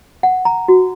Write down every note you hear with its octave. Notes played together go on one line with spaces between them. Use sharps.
F#5
A#5
F#4